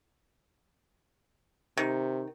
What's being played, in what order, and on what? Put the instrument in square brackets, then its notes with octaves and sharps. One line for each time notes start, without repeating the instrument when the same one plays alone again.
[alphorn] C3 [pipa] D#3